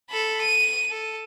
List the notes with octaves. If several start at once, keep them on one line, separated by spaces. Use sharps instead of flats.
A4 B5
D#7
A4